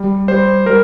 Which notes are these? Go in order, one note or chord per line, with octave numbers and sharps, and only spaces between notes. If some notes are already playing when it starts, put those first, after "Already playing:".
Already playing: G3
G3 C5
G3 A#4